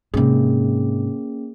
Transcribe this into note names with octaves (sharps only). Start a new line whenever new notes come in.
G#2 C3 A#3 C#4 G#4